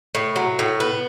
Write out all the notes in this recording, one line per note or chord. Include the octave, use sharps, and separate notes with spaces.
A2
F#3
A2
B3